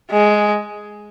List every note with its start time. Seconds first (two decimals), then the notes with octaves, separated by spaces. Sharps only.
0.11 G#3